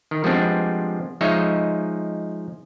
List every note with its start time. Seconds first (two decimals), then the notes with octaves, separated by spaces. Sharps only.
0.11 D#3
0.24 F3 G3 G#3 B3 C4 D4
1.21 F3 G#3 D#4 C#5 E5 F5